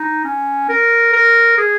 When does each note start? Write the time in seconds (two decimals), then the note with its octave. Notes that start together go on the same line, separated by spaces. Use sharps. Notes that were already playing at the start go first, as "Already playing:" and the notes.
Already playing: D#4
0.25 C#4
0.69 A#4
1.13 A#4
1.58 G#4